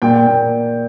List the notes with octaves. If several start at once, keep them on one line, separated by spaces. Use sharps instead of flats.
A#2 G5
G5
A#2 G5